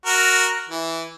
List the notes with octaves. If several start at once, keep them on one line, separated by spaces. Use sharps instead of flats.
F#4 A#4
E3